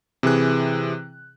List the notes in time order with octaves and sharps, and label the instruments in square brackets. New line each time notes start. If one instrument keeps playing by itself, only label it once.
[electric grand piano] C3 E3 G#4 F#6